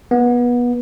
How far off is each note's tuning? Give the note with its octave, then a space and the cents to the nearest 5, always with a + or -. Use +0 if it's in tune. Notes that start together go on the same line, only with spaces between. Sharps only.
B3 -25